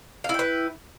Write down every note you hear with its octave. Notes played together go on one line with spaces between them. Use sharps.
E4 B4 F5 G5